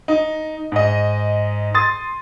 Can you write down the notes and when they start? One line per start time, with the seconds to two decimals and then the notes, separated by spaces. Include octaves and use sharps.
0.08 D#4
0.72 G#2 D#5
1.74 C6 D#6 A6